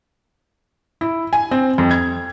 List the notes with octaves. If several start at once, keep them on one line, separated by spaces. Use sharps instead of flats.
E4
G#5
C4
F2
G#6